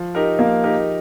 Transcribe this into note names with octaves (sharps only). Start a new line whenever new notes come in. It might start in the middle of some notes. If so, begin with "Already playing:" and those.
Already playing: F3
D#4 G4 A#4
F3 A#3
D#4 G4 A#4